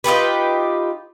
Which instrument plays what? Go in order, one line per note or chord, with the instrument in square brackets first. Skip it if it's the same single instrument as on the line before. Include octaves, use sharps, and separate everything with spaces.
[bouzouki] D#4 F4 G4 B4